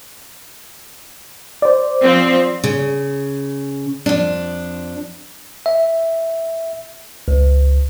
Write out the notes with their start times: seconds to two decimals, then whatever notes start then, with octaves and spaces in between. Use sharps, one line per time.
1.62 C5 D5
2.02 F3 C4
2.64 C#3
4.06 F2 D4
5.66 E5
7.28 C#2